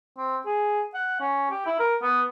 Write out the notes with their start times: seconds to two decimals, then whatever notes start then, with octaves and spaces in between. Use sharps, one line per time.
0.18 C4
0.46 G#4
0.94 F#5
1.20 C#4
1.50 G4
1.66 E4
1.80 A#4
2.02 B3